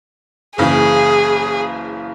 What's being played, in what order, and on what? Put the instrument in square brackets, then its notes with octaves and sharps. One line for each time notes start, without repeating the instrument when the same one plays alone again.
[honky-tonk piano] F#1 C#3 E3 [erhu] G#4